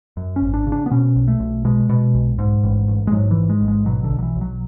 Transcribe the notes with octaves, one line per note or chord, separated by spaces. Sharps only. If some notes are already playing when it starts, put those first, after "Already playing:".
F#2
C#4
G#1
D4
C#3
D4
B3
B2 C#4
B1
A3
B1
B2 G#3
B2
B1
G#2
A1
A1
G#3
G#2 F#3
E3
G#2
G#3
A1
G#3
B2 F#3
D3
B1
F#3
E3
B1
F#3